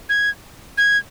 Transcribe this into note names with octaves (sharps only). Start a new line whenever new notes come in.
G#6
G#6